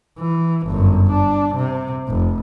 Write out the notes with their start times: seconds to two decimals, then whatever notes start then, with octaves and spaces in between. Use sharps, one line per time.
0.19 E3
0.67 G1 F#2
1.11 D4
1.55 C3
2.08 F1